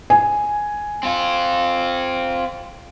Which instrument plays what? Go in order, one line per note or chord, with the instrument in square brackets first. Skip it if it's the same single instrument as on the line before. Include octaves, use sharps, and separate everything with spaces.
[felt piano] G#5
[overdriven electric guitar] C4 F4